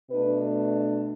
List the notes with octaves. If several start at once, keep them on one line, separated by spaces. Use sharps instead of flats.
B2 A3 D4 B4